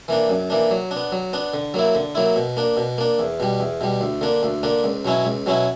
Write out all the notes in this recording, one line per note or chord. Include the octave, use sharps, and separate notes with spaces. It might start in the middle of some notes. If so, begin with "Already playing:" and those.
E3 A#3 D4
F#2
E3 A#3 D4
F#3
D4
B3
F#3
B3 D4
D3
F#3 A#3 E4
D3
F#3 A#3 E4
B2
A#3 D4
B2
A#3 D4
E2
B2 G3
E2
B2 G3
D2
D3 A#3 D4
D2
D3 A#3 D4
C#2
B2 F#3 C#4 E4
C#2
B2 F#3 C#4 E4